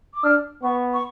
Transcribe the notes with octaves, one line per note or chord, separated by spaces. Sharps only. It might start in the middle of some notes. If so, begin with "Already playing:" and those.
D6
D4 F6
B3 C#6
C#6